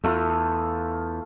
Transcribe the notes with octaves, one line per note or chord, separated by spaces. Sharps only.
E2 A3 F4 A4